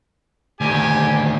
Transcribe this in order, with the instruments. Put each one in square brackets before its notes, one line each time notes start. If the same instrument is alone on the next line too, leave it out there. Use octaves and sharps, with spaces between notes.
[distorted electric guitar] D2 D#3 [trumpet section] G4 G#5